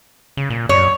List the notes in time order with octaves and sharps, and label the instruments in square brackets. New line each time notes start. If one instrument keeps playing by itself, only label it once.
[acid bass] C#3
A#2
[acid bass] F#2 [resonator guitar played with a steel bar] C#5